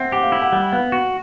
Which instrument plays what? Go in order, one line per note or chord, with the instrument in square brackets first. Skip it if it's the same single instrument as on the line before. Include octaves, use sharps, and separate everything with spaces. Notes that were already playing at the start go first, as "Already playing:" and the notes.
Already playing: [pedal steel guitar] C4 [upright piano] E5 F#5
[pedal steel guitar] G4 [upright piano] F#5
[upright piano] F5
[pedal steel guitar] E4
[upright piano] F#5
[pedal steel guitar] G3 [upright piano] F#5
[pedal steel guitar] B3 [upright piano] F5
[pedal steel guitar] F#4